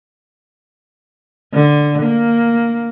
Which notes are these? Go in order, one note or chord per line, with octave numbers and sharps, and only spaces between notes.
D3
A#3